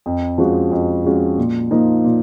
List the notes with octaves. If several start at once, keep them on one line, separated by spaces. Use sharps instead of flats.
F2
F3 G#3 C#4 F#4
F2
F3 G#3 C#4 F#4
A#2
F3 A#3 D#4
A#2